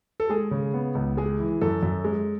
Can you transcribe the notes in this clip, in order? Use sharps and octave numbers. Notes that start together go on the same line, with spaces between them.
A4
G#3 G#4
C#3
B3
C#2
G#3 G#4
E3
F#2 A4
F#2
G#3